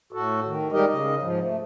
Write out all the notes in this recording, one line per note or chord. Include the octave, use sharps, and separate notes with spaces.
A2 F#4 A4
D#3
G3 G#3 D#4 G4 A#4 D#5
C#3 D#5
G#2 F3
A3